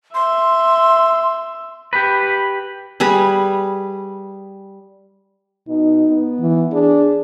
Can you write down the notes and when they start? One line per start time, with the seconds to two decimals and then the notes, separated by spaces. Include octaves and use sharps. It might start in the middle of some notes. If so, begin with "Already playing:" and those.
0.15 E5 C6
1.93 G4 B4
3.00 G3 G#4 B4
5.68 B2 D#4
6.09 B3
6.41 E3
6.72 D4 G#4